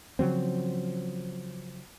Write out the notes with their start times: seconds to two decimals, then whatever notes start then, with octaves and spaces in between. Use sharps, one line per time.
0.19 C#3 F3 F#3 C4